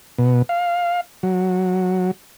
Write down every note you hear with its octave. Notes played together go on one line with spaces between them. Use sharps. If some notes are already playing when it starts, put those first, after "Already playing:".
B2
F5
F#3